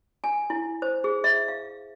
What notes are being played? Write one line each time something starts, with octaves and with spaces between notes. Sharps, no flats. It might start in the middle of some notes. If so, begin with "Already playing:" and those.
G#5
E4
C5
G#4
E5
F5